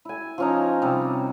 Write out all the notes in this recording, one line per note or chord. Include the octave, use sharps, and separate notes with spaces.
E4 G#5
F3 C#4 D#4
C3 G3